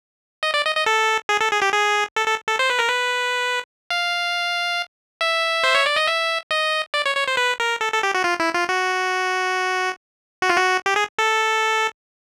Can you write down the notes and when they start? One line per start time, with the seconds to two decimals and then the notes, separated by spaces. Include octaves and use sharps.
0.43 D#5
0.54 D5
0.65 D#5
0.75 D#5
0.86 A4
1.29 G#4
1.41 A4
1.51 G#4
1.62 G4
1.73 G#4
2.16 A4
2.27 A4
2.48 A4
2.59 C5
2.70 B4
2.79 A#4
2.88 B4
3.90 F5
5.21 E5
5.63 C5
5.75 C#5
5.86 D5
5.96 D#5
6.07 E5
6.51 D#5
6.94 D5
7.06 C#5
7.16 C#5
7.28 C5
7.37 B4
7.60 A#4
7.81 A4
7.92 A4
8.03 G4
8.14 F#4
8.24 F4
8.40 E4
8.54 F4
8.69 F#4
10.42 F#4
10.50 F4
10.57 F#4
10.86 G4
10.96 G#4
11.19 A4